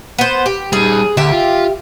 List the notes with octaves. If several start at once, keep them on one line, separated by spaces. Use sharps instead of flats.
B3 C5
G4
G3 D#4 G#4
D2 G4 E5
F4